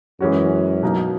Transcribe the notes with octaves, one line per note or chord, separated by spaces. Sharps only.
F#2 E3 G#3 C#4 F#4
B2 F#3 A#3 D#4